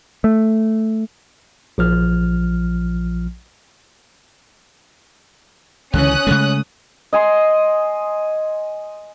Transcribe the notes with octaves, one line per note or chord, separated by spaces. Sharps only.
A3
A#1 F3 F6
C#2 D3 E3 C#4 D#6 F#6
C#3 G#3 A3
D#5 G#5 C6